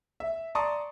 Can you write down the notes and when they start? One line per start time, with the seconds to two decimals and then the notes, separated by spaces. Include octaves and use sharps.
0.20 E5
0.55 D5 A5 A#5 C6 C#6 D#6